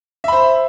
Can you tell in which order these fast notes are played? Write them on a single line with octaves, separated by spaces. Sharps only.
E5 B5 C5